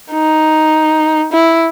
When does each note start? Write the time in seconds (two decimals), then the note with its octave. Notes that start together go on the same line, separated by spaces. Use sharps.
0.12 D#4
1.33 E4